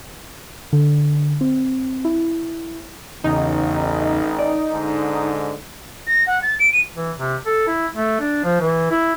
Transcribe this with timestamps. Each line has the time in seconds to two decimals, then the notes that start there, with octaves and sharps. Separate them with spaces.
0.73 D3
1.41 C4
2.05 E4
3.24 A1 E2 C#3 D#4
4.39 D5
4.71 G#2 D3
6.06 A#6
6.26 F#5
6.42 A6
6.59 D7
6.72 D#7
6.95 E3
7.17 C3
7.46 A4
7.67 E4
7.94 A3
8.20 D4
8.44 F3
8.61 E3
8.91 E4